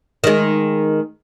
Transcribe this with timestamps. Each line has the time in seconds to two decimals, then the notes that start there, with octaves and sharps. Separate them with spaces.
0.24 D#3 G#3